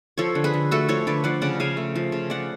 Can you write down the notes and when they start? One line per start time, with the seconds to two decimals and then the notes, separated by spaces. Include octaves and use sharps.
0.18 F3 A4 C#5
0.35 D3
0.44 G#4 B4
0.54 D3
0.71 A3 F#4 A4
0.88 F3 A4 C#5
1.07 D3 B4 D5
1.24 F3 D5 F#5
1.42 C#3 D5 F#5
1.60 C#3 F5 G#5
1.77 A3
1.96 F3
2.12 C#3
2.30 F3 D5 F#5